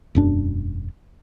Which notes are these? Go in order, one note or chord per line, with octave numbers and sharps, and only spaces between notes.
E1 F#2 D4